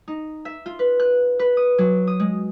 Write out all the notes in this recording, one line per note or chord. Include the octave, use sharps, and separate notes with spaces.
D#4
E5
F4
B4
F#6
B4
D#6
F#3
D#6
G#3